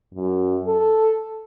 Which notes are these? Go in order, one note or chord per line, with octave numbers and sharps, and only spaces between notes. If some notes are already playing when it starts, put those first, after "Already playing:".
F#2
A4